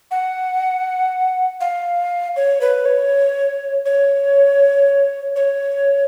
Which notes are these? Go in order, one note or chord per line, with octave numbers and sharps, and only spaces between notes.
F#5
F5
C#5
B4
C#5
C#5
C#5